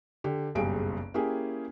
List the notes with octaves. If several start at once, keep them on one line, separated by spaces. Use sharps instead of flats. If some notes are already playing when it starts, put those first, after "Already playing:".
D3 G4
F#1 B1 G2 G4 G#4 D7
A#3 C#4 E4 G4 G#4